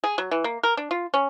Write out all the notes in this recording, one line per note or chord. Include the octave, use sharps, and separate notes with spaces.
G#4
F#3
E3
A#3
A#4
D4
F4
C#4